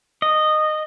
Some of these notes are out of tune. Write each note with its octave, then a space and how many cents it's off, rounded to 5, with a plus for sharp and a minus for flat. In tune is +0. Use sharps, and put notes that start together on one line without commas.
D#5 -15